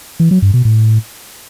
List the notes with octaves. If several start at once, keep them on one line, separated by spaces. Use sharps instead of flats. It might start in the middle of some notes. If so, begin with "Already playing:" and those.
E3
F#3
G2
B2
A2